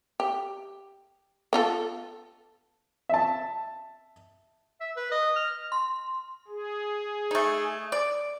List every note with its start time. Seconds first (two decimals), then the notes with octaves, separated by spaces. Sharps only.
0.20 G4
1.53 B3 F4 A4
3.09 E5 A5
4.80 E5
4.96 B4
5.11 D#5
5.36 F6
5.72 C6
6.48 G#4
7.31 A3 D#4
7.92 D5